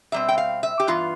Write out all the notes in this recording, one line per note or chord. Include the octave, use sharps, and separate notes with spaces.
B2 G3 C4 E5
G5
F5
E5
G4
G2 E3 B3 F4